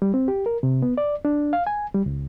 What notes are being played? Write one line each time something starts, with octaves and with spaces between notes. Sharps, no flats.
G3
C4
G4
A#4
C3
B3
D5
D4
F5
G#5
G3
C#2